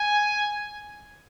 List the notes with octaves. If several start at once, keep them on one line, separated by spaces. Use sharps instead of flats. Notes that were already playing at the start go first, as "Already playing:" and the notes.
Already playing: G#5